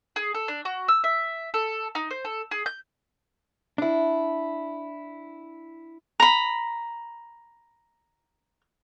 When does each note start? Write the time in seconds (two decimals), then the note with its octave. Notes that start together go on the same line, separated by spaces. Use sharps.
0.16 G#4
0.34 A4
0.48 D4
0.65 F#4
0.88 E6
1.04 E5
1.54 A4
1.95 D#4
2.11 C5
2.25 A4
2.51 G#4
2.66 G6
3.78 D4 E4
6.20 A#5 B5